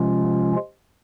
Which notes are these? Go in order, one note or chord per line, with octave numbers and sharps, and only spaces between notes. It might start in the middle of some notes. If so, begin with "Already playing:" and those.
Already playing: C3 F3 G#3 C#4 F4